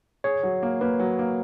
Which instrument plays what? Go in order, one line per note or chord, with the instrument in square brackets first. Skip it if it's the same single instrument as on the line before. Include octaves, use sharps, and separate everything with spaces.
[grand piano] G#4 [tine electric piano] C#5
[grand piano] F#3
A#3
[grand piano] A#3 [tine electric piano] B4
[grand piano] F#3
A#3